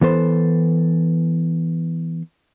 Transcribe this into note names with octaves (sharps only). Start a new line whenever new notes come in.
E3 B3 A4 C5